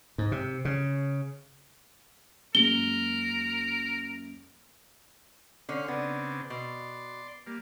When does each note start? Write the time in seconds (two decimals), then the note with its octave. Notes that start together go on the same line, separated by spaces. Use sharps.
0.18 G#2
0.32 C3
0.65 C#3
2.55 F#2 G#3 A#3 A#4 G7
5.69 D3 C#4 C5 F5
5.88 C#3 B3 C4 D4
6.50 B2 D5 C6
7.47 G3 A#3